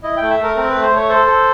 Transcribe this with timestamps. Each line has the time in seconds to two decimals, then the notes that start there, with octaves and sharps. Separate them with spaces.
0.03 E4 D#5
0.17 A3 G5
0.30 E5
0.39 A3 A#4
0.57 C4 A#4
0.69 A3 B4
0.82 C5
0.91 A3 C#5
1.09 A4 C5
1.27 A4